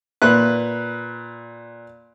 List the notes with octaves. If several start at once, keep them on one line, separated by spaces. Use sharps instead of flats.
A#2 B4 F#6